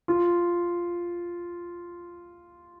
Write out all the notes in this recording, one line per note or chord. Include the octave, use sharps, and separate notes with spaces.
F4